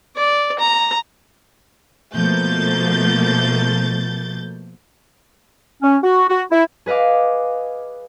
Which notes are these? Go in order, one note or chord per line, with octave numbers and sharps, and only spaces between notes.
D5
A#5
B2 F3 A3 A#3 G6 A6
C#4
F#4
F#4
E4
G#4 B4 D#5 F5 D6